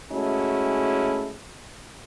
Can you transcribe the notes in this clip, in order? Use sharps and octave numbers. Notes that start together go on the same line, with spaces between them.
G#3 A3 C#4 E4 F#4 G#4